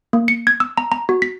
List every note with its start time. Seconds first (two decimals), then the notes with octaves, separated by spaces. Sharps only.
0.13 A#3
0.28 C#7
0.47 G#6
0.60 E6
0.78 A#5
0.92 A#5
1.09 F#4
1.22 B6